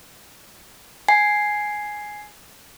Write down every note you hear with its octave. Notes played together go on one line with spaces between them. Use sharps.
G#5 C7